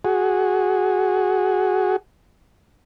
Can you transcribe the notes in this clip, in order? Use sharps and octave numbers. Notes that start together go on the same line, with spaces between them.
F#4 G#4